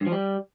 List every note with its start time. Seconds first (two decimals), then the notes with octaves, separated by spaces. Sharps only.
0.01 G2
0.06 F3
0.12 G3